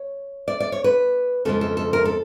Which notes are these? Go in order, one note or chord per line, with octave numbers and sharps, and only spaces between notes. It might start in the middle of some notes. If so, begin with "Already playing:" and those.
Already playing: C#5
D5
D5
C#5
B4
F2 C#3 F3 G#3 A4
A4
A4
A#4
A4